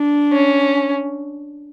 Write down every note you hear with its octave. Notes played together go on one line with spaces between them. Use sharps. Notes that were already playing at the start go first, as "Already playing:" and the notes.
Already playing: D4
C#4